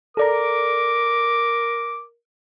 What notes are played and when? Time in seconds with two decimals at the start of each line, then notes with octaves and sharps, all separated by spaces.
0.17 A4 A#4 D5 A#5 D6